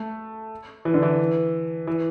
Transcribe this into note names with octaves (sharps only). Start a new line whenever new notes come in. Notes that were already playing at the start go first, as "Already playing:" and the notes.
Already playing: A3
E3
D3
E3
E3